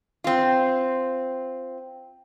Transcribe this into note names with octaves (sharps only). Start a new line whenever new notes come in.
C4 F4